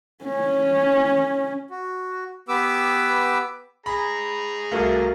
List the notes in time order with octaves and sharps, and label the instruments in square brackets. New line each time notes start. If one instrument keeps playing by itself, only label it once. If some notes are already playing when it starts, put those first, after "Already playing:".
[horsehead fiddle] C#4
[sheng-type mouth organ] F#4
B3 G4 B4 D6 E6
[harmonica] G#4 A#5 [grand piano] B5
[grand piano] C2 A3 [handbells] F#4 A#4 F5